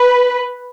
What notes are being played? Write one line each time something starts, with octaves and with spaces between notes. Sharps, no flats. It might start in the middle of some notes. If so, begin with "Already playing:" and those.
Already playing: B4